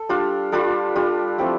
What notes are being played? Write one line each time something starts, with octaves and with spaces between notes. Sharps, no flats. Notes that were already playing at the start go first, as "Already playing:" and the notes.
Already playing: A4
G3 D4 F4
G3 D4 F4 A4
G3 D4 F4
F3 A3 C4 E4 G4